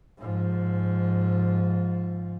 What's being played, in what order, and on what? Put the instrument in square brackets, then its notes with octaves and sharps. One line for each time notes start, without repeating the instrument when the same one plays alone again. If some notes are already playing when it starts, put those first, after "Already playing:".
[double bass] G#2 F3